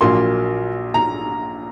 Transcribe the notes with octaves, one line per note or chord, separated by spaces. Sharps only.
A#1 A#2 F#3 A#3 C6
A#5